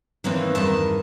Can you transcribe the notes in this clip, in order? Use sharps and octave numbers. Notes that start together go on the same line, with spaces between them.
D#3 E3 F#3 A#3 C4
E2 G2 D#3 A5